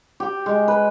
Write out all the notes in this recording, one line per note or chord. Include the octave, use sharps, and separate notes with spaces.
G4
G#3
B4